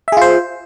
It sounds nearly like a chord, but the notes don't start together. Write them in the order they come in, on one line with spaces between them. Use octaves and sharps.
E5 G#4 F4 C5